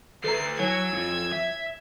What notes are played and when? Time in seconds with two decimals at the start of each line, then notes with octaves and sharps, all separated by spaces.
0.24 D2 A3 A4 B4 A#5 C7
0.59 F#3 E4 C#5 G#5 E6 G#6
0.93 F2
1.32 E5